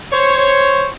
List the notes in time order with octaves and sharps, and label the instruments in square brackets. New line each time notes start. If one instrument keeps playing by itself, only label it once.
[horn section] C5 C#5